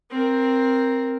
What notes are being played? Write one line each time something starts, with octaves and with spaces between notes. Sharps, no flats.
C4 A#4